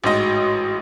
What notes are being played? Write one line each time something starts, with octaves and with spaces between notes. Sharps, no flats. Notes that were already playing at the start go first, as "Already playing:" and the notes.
A1 G#2 F#4 D#5